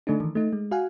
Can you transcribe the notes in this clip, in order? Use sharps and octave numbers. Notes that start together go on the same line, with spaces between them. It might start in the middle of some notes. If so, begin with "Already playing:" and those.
D3 A3 D4 D#4
D#3 E3
A3 D#4
G#3
F#4 F5 F#5 G#5